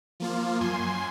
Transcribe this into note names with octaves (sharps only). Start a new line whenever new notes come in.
F3 A#3 F4
F#2 G#5 C6